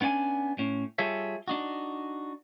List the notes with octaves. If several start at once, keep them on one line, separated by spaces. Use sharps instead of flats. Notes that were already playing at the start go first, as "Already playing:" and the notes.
B3 C#4 D4 G5 G#5
A2 C#4
G3 F4 G#4 A4 C#5 E5
D4 D#4 F#4